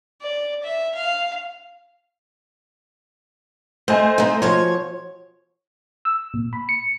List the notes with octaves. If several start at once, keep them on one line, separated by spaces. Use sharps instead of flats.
D5
E5
F5
A3 C5 D#5 G#5
A3 D#4
B2 F3 C#5
E6
A#2
B5
C#7